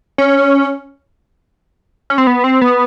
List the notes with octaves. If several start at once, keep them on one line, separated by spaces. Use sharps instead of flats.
C#4
C#4
C4
B3
C4
B3